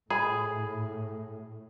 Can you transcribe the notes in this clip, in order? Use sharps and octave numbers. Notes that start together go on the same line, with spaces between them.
A2 G#4 B5